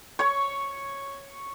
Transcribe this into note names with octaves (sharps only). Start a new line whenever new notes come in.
C#5 C#6